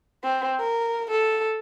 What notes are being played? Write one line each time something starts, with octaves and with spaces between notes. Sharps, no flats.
C4
A#4
A4